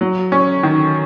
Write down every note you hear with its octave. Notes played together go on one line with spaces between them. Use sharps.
F#3
C#4
D#3